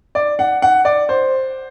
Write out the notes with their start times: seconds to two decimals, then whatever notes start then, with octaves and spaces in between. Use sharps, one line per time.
0.15 D5
0.39 F#5
0.62 F#5
0.85 D5
1.09 C5